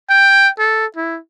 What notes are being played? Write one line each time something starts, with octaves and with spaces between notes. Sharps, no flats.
G5
A4
E4